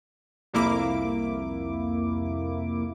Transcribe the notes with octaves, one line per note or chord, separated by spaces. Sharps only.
C2 F2 A#3 E4 D6